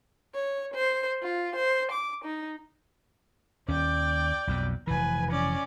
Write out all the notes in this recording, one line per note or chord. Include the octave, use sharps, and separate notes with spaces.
C#5
C5
F4
C5
D6
D#4
D#2 C#4 D5 G5
B1 F2 B2
F1 E3 B4 G#5
C#4 D5